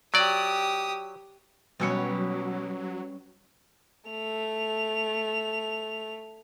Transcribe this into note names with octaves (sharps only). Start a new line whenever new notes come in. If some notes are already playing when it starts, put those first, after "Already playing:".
F#3 G4 D5 D#6
B2 F#3 G3 C#4 B4 E6 C#7
A3 F7